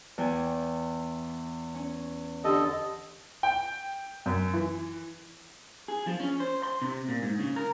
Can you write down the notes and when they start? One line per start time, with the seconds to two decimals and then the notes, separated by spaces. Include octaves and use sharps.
0.18 E2 G5 G#5
1.75 C#4
2.44 D3 G4 A4 D#5
3.43 G5
4.26 F#2
4.54 E3
5.88 G#4
6.07 F3
6.20 C#4
6.40 C5
6.63 C6
6.82 C3
7.09 A#2
7.22 G#2
7.39 C#3
7.56 A#4